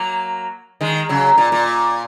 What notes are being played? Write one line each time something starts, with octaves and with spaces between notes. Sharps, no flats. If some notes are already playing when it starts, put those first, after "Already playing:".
Already playing: F#3 A#3
D#3 G#3
C#3 F#3
A#2
A#2